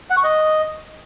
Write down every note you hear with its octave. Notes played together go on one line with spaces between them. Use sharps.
F#5
C#6
D#5